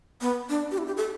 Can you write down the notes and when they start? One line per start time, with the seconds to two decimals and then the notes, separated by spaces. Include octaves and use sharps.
0.21 B3
0.49 D4
0.71 G4
0.78 E4
0.87 G4
0.97 A4